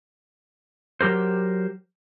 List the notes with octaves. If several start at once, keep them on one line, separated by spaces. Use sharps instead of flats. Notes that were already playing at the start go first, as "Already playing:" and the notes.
F#3 G4 A#4 C5